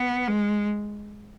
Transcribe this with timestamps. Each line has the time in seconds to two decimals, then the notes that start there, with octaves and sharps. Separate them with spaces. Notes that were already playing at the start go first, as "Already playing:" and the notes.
Already playing: B3
0.28 G#3